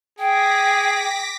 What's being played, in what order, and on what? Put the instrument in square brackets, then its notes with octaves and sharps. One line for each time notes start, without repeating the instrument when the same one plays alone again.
[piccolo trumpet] G#4 [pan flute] G5 [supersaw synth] D6 A#6 B6